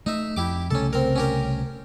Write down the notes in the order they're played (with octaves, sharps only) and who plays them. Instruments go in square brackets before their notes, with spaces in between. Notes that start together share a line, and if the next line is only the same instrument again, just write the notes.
[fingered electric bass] A3 [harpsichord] D#4 E5
[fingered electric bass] F2 [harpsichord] E4 G4 D6
[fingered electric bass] C2 C#3 A3 [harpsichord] C#4 A4
[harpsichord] C4 A#4
C#4 G4 A#4